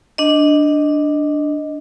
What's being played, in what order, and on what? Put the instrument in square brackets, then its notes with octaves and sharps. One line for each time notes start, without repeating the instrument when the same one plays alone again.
[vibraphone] D4 D#5